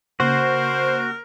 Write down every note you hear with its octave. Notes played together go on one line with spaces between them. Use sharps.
C#3 A#3 F#4 A#4 C5